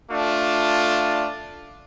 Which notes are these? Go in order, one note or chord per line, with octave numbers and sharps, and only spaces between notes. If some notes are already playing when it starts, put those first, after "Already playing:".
A3 D4 F4